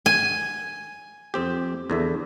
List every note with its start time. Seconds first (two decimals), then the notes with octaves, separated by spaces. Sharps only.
0.06 G#5
1.34 F2 C4 G4
1.90 E2 D3 E5